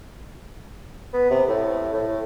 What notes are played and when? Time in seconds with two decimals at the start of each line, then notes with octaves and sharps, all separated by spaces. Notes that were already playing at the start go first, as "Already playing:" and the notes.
1.13 B3
1.31 C3
1.48 A2
1.93 A2